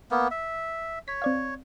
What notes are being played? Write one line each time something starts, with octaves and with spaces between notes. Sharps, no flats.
A#3 B3
E5
C#5 B6
C4 D5 F5